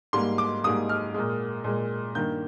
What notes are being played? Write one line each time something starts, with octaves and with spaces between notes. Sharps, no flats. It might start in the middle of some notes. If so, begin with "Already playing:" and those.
G#2 G3 A#3 C6
D6
G#2 G3 A#3 D#6
F6
A#2 G#3
A#2 G#3
G2 D#3 A#3 G6